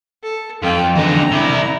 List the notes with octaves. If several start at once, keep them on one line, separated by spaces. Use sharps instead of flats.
A4
F2 F4 G5
E2 D3 A#5
C3 E4